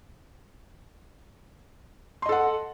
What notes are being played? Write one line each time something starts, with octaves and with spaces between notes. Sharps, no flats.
A4 D#5 F#5 C6